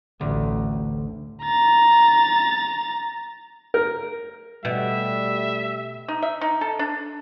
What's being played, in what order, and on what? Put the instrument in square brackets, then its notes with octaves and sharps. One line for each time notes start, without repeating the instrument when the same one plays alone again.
[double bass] A1 [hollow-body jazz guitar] D2
[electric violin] A#5 A6
[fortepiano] A#4
[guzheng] B2 [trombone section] G3 A3 [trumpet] E5
[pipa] D#4
E5
D#4
A4
D4